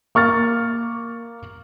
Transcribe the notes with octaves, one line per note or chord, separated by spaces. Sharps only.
A#3 C#6 F6 A6